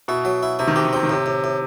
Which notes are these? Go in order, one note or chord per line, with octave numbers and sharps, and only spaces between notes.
B2 E4
F#3
E4
C3 E4
D#3
C3 G4
D#3
C3 C4
D#3
A2 C3
A2
A2